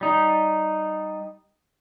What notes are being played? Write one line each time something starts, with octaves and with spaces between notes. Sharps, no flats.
G3 D#4